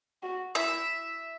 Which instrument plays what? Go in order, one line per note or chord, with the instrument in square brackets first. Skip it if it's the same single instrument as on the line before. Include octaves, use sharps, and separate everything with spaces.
[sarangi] F#4
[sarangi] E4 [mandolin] E5